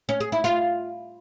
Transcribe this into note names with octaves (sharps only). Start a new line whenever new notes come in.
C#4
G#4
E4
F4